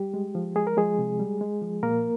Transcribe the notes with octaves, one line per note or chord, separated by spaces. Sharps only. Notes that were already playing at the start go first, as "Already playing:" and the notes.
Already playing: G3 G4
G#3
F3
G#3 G#4
A#4
F3 G#3 G#4
C3
G3
G#3
F3
A#2 A#3 A#4